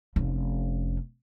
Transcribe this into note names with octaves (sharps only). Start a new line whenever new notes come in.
F1 C#4